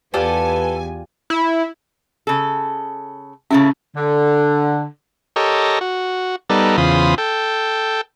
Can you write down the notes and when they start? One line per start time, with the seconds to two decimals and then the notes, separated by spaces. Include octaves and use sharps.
0.14 E2 F4 G4 A4 B4 D5 F#5 G#5
1.30 E4
2.27 C#3 A4
3.51 C#3 A3 C#4 E4
3.96 D3
5.36 G4 A4 A#4 C#5 D#5
5.81 F#4
6.50 G3 B3 D#4 A4 A#4 D5
6.78 E2 C#3 F4 C5 B5 D#6
7.18 A4 G5